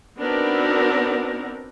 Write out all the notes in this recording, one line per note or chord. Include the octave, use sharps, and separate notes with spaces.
B3 C4 D4 D#4 F#4 A#4